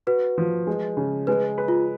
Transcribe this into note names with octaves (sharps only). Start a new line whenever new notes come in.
F#4 B4
F3
G#3
C#3
G#3 B4
B4
F4